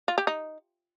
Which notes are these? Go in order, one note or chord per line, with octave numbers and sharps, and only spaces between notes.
F4
G4
D#4